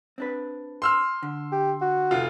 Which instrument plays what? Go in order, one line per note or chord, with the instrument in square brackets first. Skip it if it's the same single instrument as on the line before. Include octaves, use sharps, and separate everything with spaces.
[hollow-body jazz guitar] C4 D4 B4
[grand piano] C6 E6 F6
[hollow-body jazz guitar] D3
[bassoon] G4
F#4
[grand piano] F1 F4